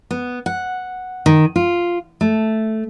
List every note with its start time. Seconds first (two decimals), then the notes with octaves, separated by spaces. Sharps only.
0.11 B3
0.46 F#5
1.26 D#3
1.56 F4
2.21 A3